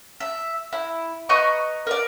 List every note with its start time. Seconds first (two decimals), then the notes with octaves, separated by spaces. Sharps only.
0.20 E5
0.73 E4
1.29 B4 D#5 A#5 C#6
1.87 A#4 D5